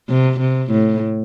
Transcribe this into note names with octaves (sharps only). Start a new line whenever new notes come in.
C3
C3
A2